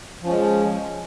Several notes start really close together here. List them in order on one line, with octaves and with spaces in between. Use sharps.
F3 C#4 G#3